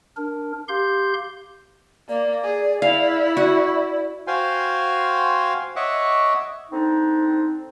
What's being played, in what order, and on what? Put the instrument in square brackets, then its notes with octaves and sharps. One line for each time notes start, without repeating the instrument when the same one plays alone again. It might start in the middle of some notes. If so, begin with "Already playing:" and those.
[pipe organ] D4 A#4
G4 F5 C6 G6
[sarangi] A#3 [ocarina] D5
[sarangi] G#4
[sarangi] E4 [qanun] F5
[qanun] F#4
[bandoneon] F#4 C5 F5 G5 G#5 C6
C#5 D#5 E5 F#5 C#6 D6
[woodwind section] D3 C4 D4 D#4